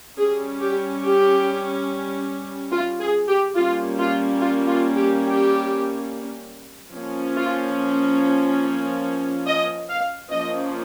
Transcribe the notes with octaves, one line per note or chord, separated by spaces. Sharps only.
G3 C#4 G#4
G4
G4
F4
G#4
G4
G3 A#3 C#4 F4
F4
F4
F4
G4
G4
F3 A#3 C#4
F4
D#5
F5
F3 A#3 C#4 D#5